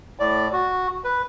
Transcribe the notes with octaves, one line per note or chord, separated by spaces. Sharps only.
A2 D5
F#4
B4